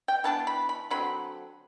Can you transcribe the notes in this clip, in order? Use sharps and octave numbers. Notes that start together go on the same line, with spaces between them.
G5
E3 B3 D4 A5
B5
B5
D3 F#3 C4 B5